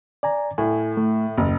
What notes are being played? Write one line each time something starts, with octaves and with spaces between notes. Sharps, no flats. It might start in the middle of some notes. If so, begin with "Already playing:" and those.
D5 G#5 A#5
A2 G#5
A3
F#1 D#2